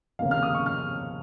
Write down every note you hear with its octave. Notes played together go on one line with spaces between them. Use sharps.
F1 D#2 C#3 A#3 F5
F6
D#6
C#6
F6